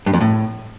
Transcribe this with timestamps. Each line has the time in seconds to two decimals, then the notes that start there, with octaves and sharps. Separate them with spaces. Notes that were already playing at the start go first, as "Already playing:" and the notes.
0.06 G2
0.13 F2
0.21 A2